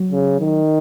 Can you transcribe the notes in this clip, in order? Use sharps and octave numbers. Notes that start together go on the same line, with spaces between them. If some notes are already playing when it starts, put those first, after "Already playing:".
Already playing: F#3
C#3
D#3